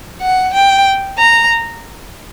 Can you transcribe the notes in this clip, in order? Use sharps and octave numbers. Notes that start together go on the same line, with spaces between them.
F#5
G5
A#5